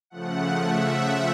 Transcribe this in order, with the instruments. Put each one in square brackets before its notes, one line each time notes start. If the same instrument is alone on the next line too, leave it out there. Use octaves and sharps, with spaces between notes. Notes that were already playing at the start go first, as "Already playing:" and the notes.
[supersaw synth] C#3 F3 A3 F#5
E5